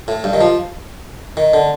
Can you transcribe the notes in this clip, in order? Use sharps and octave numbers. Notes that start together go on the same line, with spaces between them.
A2
G2
D#3
F3
D#3
D3